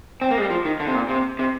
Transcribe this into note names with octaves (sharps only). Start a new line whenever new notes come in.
C4
A#3
G#3
G3
F3
D#3
D3
C3
A#2
C3
C3